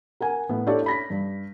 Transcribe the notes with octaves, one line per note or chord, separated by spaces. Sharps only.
A#4 F#5 G#5
A2 B3
D4 E4 G4 A4 C#5 D5
B5 A#6 B6
G2